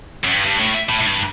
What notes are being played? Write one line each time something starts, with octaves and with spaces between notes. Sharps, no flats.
F#2
G2
G2
A2
A2
A2
G2